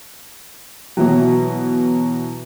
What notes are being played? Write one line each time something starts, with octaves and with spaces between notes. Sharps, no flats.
B2 E3 F#3